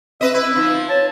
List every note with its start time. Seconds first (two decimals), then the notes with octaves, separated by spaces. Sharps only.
0.21 C4 B4 D#5 E5
0.34 E4 B4
0.56 F3 D#4
0.89 C#5 A5